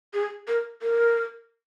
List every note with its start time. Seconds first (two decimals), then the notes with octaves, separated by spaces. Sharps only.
0.14 G#4
0.48 A#4
0.82 A#4